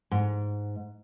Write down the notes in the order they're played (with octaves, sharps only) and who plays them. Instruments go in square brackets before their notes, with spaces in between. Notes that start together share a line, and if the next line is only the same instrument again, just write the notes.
[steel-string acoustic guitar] G#2